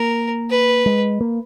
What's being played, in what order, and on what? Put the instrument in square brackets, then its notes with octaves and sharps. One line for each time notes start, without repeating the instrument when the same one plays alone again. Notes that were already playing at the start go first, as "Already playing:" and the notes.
Already playing: [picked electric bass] A#3 [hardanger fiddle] A#4
[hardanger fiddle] B4
[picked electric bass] G#3
A#3